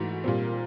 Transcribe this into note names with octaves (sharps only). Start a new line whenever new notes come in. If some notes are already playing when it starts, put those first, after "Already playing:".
Already playing: G#2 E3 A3 F#4
A#2 G3 C4 F4
A#4